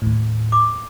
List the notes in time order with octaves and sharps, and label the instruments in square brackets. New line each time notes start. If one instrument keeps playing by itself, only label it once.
[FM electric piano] D#2 A2
[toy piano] D6